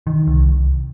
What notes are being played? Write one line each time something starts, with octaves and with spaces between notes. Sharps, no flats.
D#3
C2